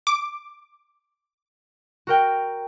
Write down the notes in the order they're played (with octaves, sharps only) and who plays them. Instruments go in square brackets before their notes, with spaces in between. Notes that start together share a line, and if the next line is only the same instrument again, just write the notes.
[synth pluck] D6
[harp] F#4 A#4 G5